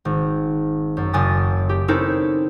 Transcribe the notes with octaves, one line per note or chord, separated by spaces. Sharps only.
G#1
F#2
F#1 G#5 D#6 A6
G4
C4 C#4 D#4 E4 A4 A#4